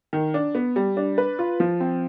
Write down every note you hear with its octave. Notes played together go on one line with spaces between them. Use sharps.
D#3
D4
B3
G3
D4
B4
F4
F3
C4